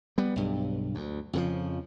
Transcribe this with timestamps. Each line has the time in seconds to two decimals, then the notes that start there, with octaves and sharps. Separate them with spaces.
0.18 G3 B3
0.36 B1 G2
0.95 D2
1.33 F2 C#3 F3